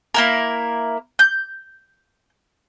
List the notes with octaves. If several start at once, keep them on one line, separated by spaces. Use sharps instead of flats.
A#3 E4 A#4
G6